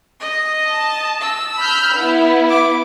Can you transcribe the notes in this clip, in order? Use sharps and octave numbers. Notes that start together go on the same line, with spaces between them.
D#5
A5
E6
B5 F6 G6
B3 E4
D6